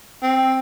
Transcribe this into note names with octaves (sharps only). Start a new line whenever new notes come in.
C4